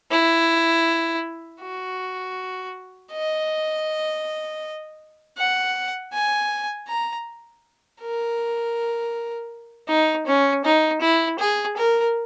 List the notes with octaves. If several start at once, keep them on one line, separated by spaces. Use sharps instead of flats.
E4
F#4
D#5
F#5
G#5
A#5
A#4
D#4
C#4
D#4
E4
G#4
A#4